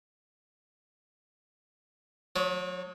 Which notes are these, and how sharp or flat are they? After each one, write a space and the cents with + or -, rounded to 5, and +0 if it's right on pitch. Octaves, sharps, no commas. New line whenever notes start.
F#3 -40 C#5 +20